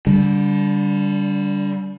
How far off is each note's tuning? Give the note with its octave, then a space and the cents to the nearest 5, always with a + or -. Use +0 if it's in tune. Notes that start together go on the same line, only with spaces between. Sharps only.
D3 -25 G3 +0